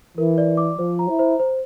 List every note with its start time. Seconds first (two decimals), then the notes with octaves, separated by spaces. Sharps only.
0.17 E3 A#4
0.38 D5
0.57 D6
0.79 F3 C5
0.99 A#5
1.09 E4
1.19 C5
1.39 C5